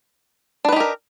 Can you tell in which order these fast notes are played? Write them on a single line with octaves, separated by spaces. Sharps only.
D4 B4 D#4 G4 A#4